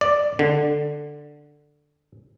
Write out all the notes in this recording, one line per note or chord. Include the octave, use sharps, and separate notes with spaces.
D5
D3